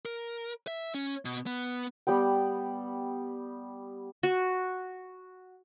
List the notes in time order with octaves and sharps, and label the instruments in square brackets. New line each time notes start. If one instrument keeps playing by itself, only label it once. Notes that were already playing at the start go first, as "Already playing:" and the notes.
[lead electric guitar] A#4
E5
C#4
B2
B3
[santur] G3 B3 G5
[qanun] F#4